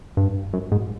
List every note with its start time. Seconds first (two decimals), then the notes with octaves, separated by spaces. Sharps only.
0.17 G2
0.53 F#2
0.72 G#2